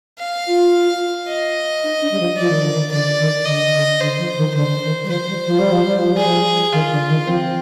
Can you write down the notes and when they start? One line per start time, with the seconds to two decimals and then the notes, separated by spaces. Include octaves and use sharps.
0.19 F5
0.47 F4
1.28 D#5
1.83 D#4
2.01 D4
2.11 G3
2.19 F3
2.37 F3 D5
2.49 D#3
2.62 D3
2.73 D#3
2.91 D3 D5
3.19 D#3
3.45 D3 D#5
3.73 D3
4.00 D3 C5
4.18 F3
4.37 D#3
4.54 D3 C5
4.82 D#3
5.03 G3
5.08 F3 C5
5.27 G3
5.45 F3
5.58 G3
5.71 F3
5.85 G3
5.98 F3
6.12 G3
6.17 G#4
6.25 F3
6.72 D#3 F4
6.90 D3
7.08 D#3
7.26 F3 C4